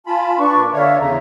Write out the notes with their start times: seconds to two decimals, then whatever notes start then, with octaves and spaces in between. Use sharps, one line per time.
0.07 F4 G#5 A5 B5
0.37 D4 B4 C#6
0.54 A#2
0.74 D3 C#5 D5 E5 F5
0.99 E2 C#3 A#5